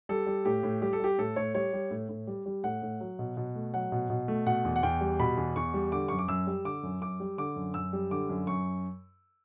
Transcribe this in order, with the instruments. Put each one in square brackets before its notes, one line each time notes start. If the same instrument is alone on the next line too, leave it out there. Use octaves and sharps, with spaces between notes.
[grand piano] G3 A4
G3
A2 G4
A2
G3 G4
A4
G3 G4
A2 A4
A2 C#5
G3 C#5
G3
A2
A2
G3
G3
A2 F#5
A2
F#3
B2
B2
A3
F#3 F#5
B2
B2
A3
B2 F#5
E2
F#5
E2 G5
G3
B2 B5
E2
E2 C#6
G3
D3 D6
F#2 C#6
D6
F#2 E6
G3
D3 D6
F#2
F#2 D6
G3
D3 D6
F#2
F#2 E6
G3
D3 D6
F#2
F#2 C#6